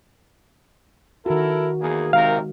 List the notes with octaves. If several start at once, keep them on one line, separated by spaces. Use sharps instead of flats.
D#3 E4 F#4 A4 A#4
E2 A#3 G#4
C3 D#3 G#3 A#4 F5